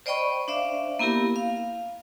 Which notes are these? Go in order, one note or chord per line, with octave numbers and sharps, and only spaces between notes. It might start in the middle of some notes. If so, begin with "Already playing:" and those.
C5 D5 D#5 G5 B5 C#6
D4 C5 D5 E5 F5
A#3 B3 E4 G4 A#4
F5